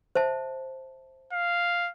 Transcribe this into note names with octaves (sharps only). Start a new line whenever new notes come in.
C5 E5 A5
F5